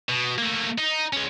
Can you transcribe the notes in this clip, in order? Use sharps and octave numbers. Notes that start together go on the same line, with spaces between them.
B2
A3 A#3
D#4
G#3 C#4